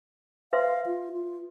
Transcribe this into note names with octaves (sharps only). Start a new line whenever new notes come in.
B4 E5 F5 C6
F4
F4